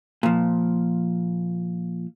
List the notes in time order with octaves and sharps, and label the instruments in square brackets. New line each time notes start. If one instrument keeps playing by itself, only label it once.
[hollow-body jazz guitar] A#2 F3